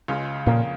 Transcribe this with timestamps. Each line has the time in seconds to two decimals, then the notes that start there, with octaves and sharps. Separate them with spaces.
0.08 C#2 C#3 G#3 F4
0.46 F2 A#2 C#3 A#3 F4